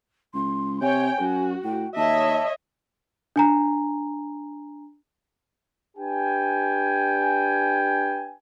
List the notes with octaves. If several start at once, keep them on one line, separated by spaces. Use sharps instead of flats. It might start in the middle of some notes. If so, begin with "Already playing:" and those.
C#2 C6
C3 C#5 G5 G#5
F#2 F#4
A2 G5
D#2 C#5 D#5 E5 A5
D4 G#5 A#5
D4 G4 B4 G5 G#5